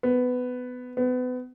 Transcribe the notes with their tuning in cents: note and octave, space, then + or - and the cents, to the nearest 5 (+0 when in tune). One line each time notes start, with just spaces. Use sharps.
B3 +15
B3 +30